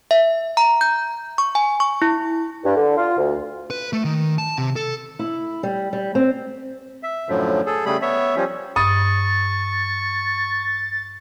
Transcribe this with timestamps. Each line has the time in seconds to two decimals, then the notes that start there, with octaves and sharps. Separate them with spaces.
0.11 E5
0.57 A#5
0.81 G6
1.38 C#6
1.55 G#5
1.80 C#6
2.02 E4
2.64 G2
2.76 D3
2.96 F4
3.17 D2
3.70 B4
3.93 A3
4.04 D#3
4.38 A5
4.58 C3
4.76 A4
5.19 E4
5.63 G3
5.93 G3
6.15 C4
7.03 E5
7.29 F#2 A2 D3 F3 F#3
7.66 G#4 A4
7.86 C#3 G3 A3 G#4 B5
8.02 B3 C#5 E5
8.36 F3 G3 C#4
8.76 G2 C#6 D#6 A6